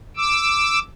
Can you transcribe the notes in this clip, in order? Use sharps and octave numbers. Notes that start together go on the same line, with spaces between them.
D6 E6